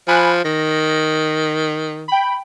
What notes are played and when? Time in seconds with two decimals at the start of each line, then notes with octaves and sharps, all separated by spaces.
0.08 F3 G#5 B5 F#6
0.44 D#3 A#6
2.08 G5 B5